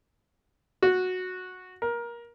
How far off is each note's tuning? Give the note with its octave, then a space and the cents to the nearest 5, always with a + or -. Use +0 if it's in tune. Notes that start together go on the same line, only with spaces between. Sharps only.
F#4 -10
A#4 +20